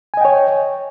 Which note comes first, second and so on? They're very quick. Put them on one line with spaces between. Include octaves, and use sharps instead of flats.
G#5 D#5 G5 C#5